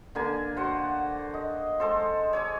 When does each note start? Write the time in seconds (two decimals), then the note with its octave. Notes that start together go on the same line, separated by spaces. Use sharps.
0.15 D3 A#3 G#5
0.56 F#4 C5 F#5
1.34 D#5
1.80 G#3 A4 C5
2.33 C#5 G#5 D6